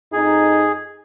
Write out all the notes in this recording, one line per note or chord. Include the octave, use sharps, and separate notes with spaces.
F2 D#4 G#4